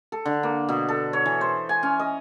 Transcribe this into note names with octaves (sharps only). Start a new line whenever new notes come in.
A4
D3
A#3
B2
A4
C#5
E3
C5
G#5
C#4
D#5